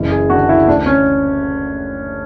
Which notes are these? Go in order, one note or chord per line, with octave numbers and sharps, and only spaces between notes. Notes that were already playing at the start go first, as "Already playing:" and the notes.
Already playing: F#1 E3
G#4
D3 F#4
E4
D2 D4
C#4